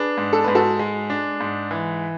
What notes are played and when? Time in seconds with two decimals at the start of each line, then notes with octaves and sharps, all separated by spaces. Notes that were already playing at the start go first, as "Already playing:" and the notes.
Already playing: D4 G#4 B4
0.18 G#2
0.33 A4
0.44 G#2 B4
0.55 F#4 A4
0.79 G#3
1.10 D4
1.40 G#2
1.71 E3